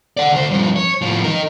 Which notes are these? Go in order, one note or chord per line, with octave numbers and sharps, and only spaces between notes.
D5 F#5
D2 C5
G2 F3
C#5
A2 F3
D#4 A#4